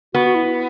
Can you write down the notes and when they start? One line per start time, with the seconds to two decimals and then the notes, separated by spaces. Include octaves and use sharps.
0.14 B3 F#4
0.25 F#4
0.35 E4
0.46 E4